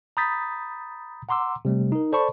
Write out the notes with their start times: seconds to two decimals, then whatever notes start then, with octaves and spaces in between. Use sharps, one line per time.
0.17 A#5 B5 D#6 G6 A6 B6
1.29 F#5 A#5 C6 D6 E6
1.65 C3 G3 A3
1.92 D#4 A#4
2.12 A4 C5 D5 A5 B5 C#6